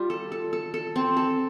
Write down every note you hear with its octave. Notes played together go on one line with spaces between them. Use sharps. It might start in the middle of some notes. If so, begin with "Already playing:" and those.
Already playing: G3 F4
A4
A4
A4
A4
C4
A4